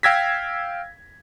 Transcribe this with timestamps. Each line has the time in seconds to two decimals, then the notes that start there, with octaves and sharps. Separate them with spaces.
0.03 F5 G5 E6 G#6 A#6 B6